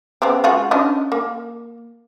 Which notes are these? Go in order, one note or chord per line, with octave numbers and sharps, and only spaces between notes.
C#3 B3 C4
G#3 F4 F#4
C#4 D4 D#5
A#3